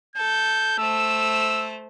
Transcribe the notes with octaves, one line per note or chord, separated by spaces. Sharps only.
A4 G6
A3 C5 E6